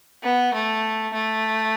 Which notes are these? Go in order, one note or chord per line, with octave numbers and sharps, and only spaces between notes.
B3
A3
A3